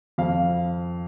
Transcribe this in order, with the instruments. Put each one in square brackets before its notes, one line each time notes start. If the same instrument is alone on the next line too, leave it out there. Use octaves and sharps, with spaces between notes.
[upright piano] F2 F5